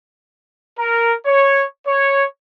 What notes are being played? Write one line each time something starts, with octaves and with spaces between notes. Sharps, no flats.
A#4
C#5
C#5